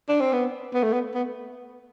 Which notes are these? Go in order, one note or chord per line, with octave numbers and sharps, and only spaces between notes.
D4
C4
B3
B3
A3
B3
B3